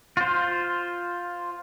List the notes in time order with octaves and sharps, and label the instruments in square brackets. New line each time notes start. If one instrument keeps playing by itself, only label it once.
[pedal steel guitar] F4 C5